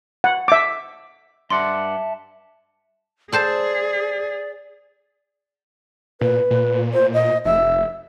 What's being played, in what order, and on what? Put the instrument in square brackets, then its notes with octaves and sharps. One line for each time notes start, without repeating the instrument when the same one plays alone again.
[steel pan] F#5
E5 D6
[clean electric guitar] G2 D5 F#5 [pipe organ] E5 A5 [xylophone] C6
[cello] G#4 [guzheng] A4 C5 A5 [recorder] D5
[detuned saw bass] A#2 [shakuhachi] B4
[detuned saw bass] A#2
[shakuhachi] C5
D#5
[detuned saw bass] F1 [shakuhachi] E5